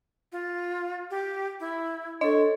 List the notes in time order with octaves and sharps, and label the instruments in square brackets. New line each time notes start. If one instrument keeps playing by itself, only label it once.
[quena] F4
G4
E4
[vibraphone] D4 A4 [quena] C#5 [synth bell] D#5